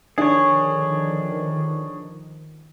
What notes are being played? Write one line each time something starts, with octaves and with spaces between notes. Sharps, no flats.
D3 D#3 F3 D4 G#4 C#5